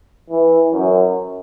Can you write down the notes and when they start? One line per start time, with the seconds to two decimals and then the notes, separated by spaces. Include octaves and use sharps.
0.30 E3
0.73 F#2